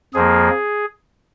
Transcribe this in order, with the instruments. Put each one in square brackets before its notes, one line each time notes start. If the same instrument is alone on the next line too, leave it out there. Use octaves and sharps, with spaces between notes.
[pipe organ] F2 F3 A#3 G#4